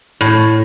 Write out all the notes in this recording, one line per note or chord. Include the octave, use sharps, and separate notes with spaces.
A2